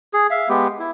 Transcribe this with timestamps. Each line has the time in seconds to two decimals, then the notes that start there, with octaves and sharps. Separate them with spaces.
0.14 G#4
0.31 E5 F5
0.49 G#3 B3 G4
0.79 E4